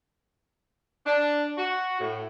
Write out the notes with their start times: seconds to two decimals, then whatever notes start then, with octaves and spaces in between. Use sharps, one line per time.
1.06 D4
1.58 F#4
2.00 A2